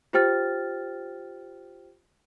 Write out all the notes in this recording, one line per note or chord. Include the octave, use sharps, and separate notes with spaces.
F4 G4 C5 G5 F6 A6